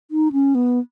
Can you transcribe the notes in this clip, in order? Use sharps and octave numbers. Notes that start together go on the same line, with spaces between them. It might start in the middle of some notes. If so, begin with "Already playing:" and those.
D#4
C#4
B3